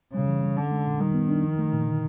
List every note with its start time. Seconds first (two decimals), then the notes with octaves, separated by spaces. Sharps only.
0.14 C#3 G3
0.28 E3
0.43 G3
0.57 D3 C#4
0.71 G#3
0.86 A#2
1.00 D#3 G3
1.14 B3
1.29 D4
1.43 F3
1.59 A3
1.73 A#2
1.87 D3